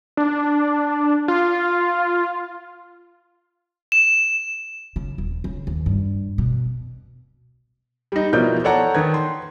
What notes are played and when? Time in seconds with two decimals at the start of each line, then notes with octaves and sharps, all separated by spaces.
0.17 D4
1.28 F4
3.92 E7
4.96 C#3
5.18 D#1
5.44 C#3
5.67 D#2
5.86 G2
6.38 B2
8.12 G3 D#4
8.33 B2 F3 E4 A#4 D5 G6
8.64 A4 C#5 D5 F#5 A5 A#5
8.94 D#3 B4 G#6
9.14 C6